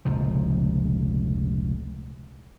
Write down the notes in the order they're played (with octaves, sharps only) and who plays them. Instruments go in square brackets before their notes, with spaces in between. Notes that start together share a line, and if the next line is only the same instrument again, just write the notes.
[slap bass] F1 C#2 A#2 F3